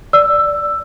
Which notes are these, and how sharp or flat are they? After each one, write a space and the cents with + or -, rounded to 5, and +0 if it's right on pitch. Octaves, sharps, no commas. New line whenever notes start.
D5 +0 E6 +10